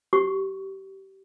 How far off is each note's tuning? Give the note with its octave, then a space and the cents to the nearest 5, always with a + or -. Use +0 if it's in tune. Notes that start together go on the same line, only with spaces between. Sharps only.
G4 -25 C#6 +20